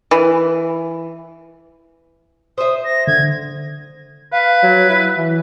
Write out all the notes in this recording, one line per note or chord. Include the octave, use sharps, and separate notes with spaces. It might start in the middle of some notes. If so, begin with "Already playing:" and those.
E3
C5 E5 D#6
A#6
D3 G#6
B4 F5
F#3
E4
E3